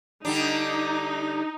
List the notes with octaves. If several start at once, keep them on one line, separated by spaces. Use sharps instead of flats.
D3 G3 D4 D#4